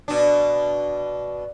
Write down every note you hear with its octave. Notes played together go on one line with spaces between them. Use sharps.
B2 D4